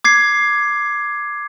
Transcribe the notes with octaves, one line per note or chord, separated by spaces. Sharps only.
D6 G#6 C7